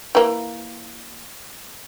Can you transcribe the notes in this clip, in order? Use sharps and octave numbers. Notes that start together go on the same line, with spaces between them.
E3 A#3